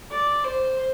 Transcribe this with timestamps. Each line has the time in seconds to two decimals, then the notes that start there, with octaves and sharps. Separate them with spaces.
0.10 D5
0.44 C5